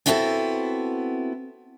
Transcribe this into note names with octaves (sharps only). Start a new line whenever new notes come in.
B3 C4 E4 F#4 G4 A4